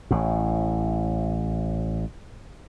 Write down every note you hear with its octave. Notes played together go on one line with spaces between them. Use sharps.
A1 A2